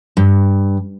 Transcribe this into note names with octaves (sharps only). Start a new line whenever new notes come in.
G2